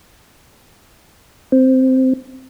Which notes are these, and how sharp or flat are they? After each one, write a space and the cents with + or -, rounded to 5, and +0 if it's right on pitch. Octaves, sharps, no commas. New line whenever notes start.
C4 -5